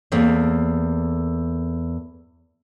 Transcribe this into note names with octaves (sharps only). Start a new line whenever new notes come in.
E2 A3 A#3 C4